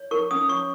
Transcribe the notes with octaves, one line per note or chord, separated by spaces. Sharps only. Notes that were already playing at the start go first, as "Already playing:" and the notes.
Already playing: C#5
A#4 C#6
C#4 D#6
C#5 C#6